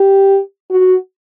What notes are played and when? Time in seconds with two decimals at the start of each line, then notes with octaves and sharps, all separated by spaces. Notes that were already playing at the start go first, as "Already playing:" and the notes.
Already playing: G4
0.71 F#4